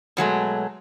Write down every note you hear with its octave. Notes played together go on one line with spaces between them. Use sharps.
B2 F#3 G#3 A3